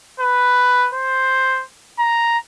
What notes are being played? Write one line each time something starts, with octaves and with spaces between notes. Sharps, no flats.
B4
C5
A#5